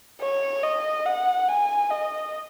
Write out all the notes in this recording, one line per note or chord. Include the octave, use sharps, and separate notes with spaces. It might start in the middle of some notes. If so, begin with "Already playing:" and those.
C#5
D#5
F#5
G#5
D#5